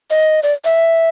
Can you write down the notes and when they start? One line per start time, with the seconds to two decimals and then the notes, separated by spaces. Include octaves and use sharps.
0.10 D#5
0.43 D5
0.65 E5